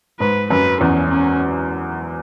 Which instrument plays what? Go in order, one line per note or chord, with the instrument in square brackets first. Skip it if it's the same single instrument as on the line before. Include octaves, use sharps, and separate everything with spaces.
[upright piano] G#2 [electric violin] B4
[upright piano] F#2 [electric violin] B4
[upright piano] E2 [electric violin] C#4
[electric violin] C#4